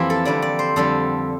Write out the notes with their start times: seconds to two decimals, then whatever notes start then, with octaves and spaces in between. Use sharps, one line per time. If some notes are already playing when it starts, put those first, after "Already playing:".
Already playing: F2 E3 A#3 C4 E4 G4
0.10 A4
0.25 F2 D3 G3 D5
0.42 D5
0.59 C5
0.76 F2 D3 G3 A4